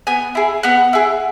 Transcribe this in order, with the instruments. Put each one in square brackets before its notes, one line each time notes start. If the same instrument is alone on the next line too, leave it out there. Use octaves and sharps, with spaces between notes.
[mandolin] B3 G#5
E4 G#4
B3 F#5
E4 G#4